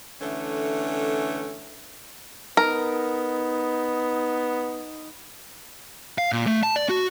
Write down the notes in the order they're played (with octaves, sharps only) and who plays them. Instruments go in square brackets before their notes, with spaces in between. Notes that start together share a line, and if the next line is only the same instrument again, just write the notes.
[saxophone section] D3 E3 A3 C#4
[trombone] B3 [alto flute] D#4 [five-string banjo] A#4
[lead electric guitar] F5
A#2
A3
A5
D5
F#4